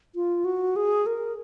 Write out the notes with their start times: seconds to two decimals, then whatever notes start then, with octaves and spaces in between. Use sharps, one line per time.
0.15 F4
0.45 F#4
0.76 G#4
1.06 A#4